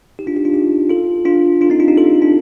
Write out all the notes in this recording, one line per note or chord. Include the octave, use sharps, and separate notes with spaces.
D#4 G4
D4 F4
D#4 G4
D4 F4
D#4 G4
F4 A4
D4 F4
D4 F4
C4 D#4
D4 F4
D#4 G4
F4 A4
D4 F4